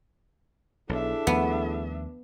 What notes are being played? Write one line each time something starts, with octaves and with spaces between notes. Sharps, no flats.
B1 D4 E4 G#4 A4 E5
D#2 F3 A3 B3